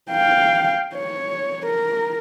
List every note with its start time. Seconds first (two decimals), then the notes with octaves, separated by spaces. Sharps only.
0.11 F5 G5
0.96 C#5
1.67 A#4